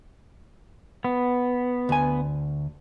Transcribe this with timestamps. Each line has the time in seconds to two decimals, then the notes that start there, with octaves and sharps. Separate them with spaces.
1.04 B3
1.89 D2 G#5